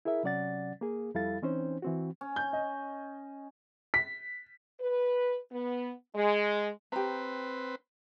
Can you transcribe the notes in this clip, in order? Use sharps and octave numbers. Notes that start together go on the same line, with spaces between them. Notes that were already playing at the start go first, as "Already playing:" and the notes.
E4 G#4 A#4 E5
C3 F#3 C#4 D5 F#5 A6
A#3 G#4
F2 G3 E4 A4 F5 A6
E3 C4 C#4 D#4 C5
E3 C4 F#4
C#4
G6
D#5
B6
B4
B3
G#3
C4 G4 B4 A#5